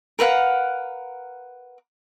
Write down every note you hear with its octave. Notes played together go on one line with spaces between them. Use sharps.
A#4 B4 F5 F#5